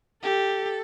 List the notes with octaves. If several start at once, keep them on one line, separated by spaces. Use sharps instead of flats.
G4 A4